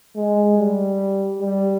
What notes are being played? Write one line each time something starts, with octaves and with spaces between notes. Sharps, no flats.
G#3
G3
G3